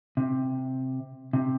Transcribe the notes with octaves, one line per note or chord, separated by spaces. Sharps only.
C3
C3